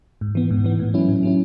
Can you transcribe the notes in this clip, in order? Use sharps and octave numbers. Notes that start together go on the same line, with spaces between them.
G#2
E3 B3
G#2
E3 B3
A2
F#3 C#4 E4
A2
F#3 C#4 E4